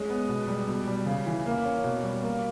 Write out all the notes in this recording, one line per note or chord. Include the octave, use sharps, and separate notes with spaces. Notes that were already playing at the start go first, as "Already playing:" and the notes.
Already playing: G#3 C#4
B3
B2
G3
B2
G3
C#3
E3
A#3
C#4
B2
G3
A#3